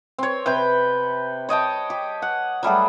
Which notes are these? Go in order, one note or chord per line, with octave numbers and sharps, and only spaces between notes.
C4 C#5
C3 B4 G5
C#5 D#5 G5 A5
G4
F#5
F#3 G3 A3 G#4